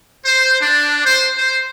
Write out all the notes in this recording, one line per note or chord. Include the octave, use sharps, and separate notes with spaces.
C5
D4
C5
C5